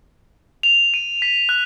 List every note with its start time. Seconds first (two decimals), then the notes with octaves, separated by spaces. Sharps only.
0.63 F7
0.94 D#7
1.22 B6
1.49 F#6